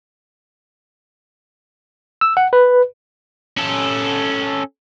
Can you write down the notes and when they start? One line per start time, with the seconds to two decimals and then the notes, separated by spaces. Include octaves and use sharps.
2.21 E6
2.37 F#5
2.53 B4
3.57 C#4 A4